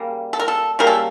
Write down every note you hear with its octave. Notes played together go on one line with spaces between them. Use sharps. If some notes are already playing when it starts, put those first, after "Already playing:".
Already playing: C#3 G3 A#3
A4
A#4
A4
C#3 G3 A#3 A#4
A4